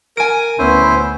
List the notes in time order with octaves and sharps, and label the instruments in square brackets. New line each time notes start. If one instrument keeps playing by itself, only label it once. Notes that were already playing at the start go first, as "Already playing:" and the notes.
[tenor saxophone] A#4 [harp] G#5 D7
[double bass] D2 B3 [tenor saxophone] C#4 [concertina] E4 C5